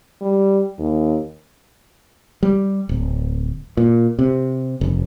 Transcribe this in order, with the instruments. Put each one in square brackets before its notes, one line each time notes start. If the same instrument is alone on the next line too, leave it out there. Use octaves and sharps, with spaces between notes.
[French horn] G3
D#2
[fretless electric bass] G3
D1
A#2
C3
F1